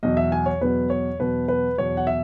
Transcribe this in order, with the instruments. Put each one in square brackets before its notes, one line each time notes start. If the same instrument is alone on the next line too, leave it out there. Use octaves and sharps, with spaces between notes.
[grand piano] E2 B2 F#3 D#5
E5
G#5
C#5
E2 B2 F#3 B4
C#5
E2 B2 F#3 B4
B4
E2 B2 F#3 C#5
F#5
E5